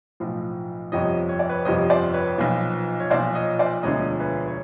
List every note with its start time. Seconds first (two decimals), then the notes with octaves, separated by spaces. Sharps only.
0.20 B1 A2 F3
0.92 G1 F2 C3 F3 C#5 D#5
1.29 C#5
1.39 D5
1.49 B4 C#5
1.65 G1 F2 C3 F3 C#5 D#5
1.90 C5 D5
2.13 B4 C#5
2.38 B1 A#2 F3
3.00 C#5
3.10 B1 A#2 F3 C5 D5
3.35 C#5 D#5
3.59 C5 D5
3.83 E1 D2 D3 F3 C#5 D#5
4.20 B4 C#5
4.48 C#5